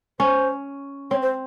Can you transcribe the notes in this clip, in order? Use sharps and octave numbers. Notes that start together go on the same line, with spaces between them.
C#4 C5
C4 C#5
C5